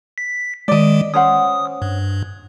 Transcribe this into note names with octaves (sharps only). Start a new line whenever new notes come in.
B6
D#3 G#3 D5 D#5
C#4 C5 F#5 D#6
G2